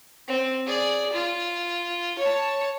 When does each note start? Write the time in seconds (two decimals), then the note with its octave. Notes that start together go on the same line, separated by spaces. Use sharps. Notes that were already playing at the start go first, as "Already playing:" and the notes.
0.28 C4
0.66 G#4 D5
1.13 F4
2.19 C#5 A5